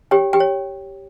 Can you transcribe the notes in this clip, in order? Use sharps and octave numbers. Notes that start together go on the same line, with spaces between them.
G4 C#5 G5
G4 G5
C#5